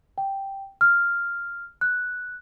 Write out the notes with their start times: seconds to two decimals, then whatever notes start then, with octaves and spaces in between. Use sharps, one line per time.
0.18 G5
0.81 F6
1.81 F#6